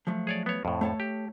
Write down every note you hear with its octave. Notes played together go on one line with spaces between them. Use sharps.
F3 F#3 A3
G#4 C#5 D5
B3 C#5
F2 A2
A3 C#5 A5
G4